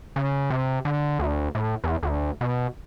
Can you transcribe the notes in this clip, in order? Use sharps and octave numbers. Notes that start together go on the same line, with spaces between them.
C#3
C3
D3
D2
A2
E2
D2
B2